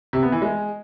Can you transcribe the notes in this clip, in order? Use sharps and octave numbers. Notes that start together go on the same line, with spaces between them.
C3
B3
E3
G#3